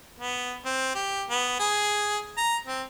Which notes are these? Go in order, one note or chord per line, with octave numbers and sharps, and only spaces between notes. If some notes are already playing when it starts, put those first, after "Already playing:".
B3
C4
G4
B3
G#4
A#5
C4